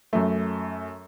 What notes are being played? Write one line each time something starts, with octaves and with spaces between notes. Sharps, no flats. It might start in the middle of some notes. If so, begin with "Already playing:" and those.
F#2 A3